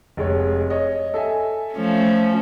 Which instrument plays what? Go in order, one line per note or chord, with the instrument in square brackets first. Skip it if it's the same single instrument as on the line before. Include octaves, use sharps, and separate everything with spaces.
[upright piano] F1 G#3 C#5
C#5 D#5
A4 E5 G#5
[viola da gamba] F3 A3 C#4